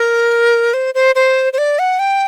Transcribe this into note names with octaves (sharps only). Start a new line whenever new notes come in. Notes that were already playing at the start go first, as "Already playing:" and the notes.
Already playing: A#4
C5
C5
C5
C5
D5
F#5
G5